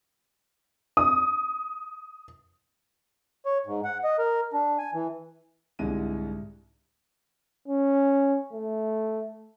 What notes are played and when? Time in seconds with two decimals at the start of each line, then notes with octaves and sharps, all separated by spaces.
0.97 D#6
3.46 C#5
3.66 G#2
3.84 F#5
4.04 D#5
4.19 A#4
4.53 D4
4.79 G#5
4.94 E3
5.79 C2 G#2 D3 G#3 E4 D#7
7.68 C#4
8.53 A3